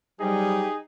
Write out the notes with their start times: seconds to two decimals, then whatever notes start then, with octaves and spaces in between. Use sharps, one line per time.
0.20 C3 F#3 G3 D#4 G4 G#4